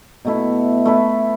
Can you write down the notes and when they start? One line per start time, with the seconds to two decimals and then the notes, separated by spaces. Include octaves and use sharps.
0.25 B2 A3 E4
0.85 A3 E4 B4